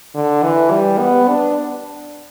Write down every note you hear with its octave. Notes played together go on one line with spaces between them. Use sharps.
D3
E3
G3
B3
D4